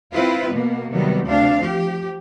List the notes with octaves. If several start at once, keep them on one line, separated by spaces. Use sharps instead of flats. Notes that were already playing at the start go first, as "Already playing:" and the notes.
C4 E4 F4 B4
B2 A#3 B3
C3 D#3 F#3 G3 B3
D2 C3 C4 D4 F5
F3 G4